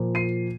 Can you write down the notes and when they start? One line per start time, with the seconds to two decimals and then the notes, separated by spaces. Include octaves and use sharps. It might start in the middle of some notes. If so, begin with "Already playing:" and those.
Already playing: A#2 F3 A#3
0.15 C7 D#7